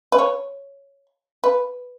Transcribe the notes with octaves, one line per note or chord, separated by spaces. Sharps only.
B4
C#5
B4